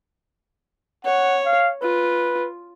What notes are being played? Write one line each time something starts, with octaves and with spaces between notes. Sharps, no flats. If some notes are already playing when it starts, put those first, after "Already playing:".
C#5 F#5
F5
F4 B4